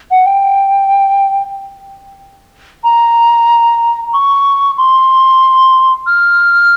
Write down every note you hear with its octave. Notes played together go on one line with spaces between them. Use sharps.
F#5
G5
A#5
C#6
C6
F6